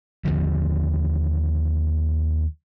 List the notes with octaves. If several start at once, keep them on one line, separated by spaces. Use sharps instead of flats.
D#2 D3 F3